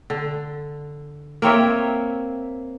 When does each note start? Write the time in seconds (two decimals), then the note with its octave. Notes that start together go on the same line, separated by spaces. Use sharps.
0.10 D3
1.42 A#3 C4 C#5 E5